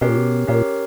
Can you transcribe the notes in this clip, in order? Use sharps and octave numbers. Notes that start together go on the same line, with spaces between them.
B2 C#4 G4 A#4 C#5
A#2
B2
A#2 C#4 G4 A#4 C#5